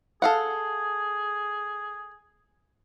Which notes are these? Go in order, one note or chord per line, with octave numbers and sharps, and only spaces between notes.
G#4 A4 F5 F#5